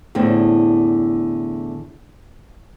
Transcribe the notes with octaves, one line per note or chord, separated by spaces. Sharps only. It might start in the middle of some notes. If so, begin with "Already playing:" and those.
E2 A2 D3 C4